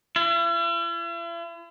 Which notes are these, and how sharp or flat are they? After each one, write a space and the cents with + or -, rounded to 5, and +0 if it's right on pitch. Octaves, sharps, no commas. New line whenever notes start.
E4 +45